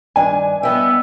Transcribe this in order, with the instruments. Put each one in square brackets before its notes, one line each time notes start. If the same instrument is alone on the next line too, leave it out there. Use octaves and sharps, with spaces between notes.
[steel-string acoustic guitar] G2 D#3 D4 [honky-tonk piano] G#5
[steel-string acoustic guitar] G3 D#5 G5 [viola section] B3 [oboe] E5